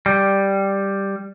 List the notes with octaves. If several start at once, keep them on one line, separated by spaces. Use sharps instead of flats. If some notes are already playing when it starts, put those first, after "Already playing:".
G3